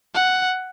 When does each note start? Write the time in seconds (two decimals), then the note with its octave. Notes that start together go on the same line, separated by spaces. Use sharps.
0.14 F#5